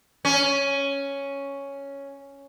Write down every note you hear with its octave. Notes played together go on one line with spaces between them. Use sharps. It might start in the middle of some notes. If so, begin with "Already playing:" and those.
C#4